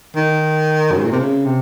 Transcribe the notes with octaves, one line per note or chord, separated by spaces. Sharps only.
D#3
F#2
G#2
A#2
C3
C#3
C3